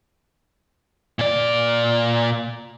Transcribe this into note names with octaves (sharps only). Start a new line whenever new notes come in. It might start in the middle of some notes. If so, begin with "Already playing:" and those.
A#2 D5